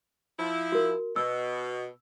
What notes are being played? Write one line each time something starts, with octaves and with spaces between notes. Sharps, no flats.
F3 E4
F#4 A#4
B2 E6